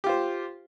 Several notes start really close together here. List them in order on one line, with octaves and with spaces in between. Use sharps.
G4 F4 C5